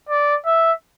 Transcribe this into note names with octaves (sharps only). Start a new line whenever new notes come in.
D5
E5